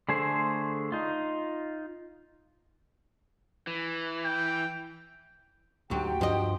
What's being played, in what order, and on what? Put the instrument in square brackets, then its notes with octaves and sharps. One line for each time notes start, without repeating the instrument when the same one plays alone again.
[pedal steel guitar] D3 A3 G#4 C5
D#4 F4
[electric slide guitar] E3
[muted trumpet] G5
[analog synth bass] D2 [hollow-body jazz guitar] G#2 F#3 [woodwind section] F#4 G4 G5
[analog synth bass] G2 [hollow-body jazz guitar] F3 D#5